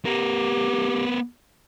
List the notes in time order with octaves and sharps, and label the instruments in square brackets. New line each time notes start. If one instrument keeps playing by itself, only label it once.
[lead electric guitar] B3 A#4 [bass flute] G4